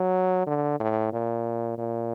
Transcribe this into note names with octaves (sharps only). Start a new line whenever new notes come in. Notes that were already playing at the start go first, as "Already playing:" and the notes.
Already playing: F#3
D3
A2
A#2
A#2